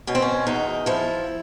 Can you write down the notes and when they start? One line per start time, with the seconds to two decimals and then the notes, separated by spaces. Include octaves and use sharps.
0.07 B2 C#4
0.15 C4
0.22 C#4
0.47 E2 D#4
0.86 F3 E4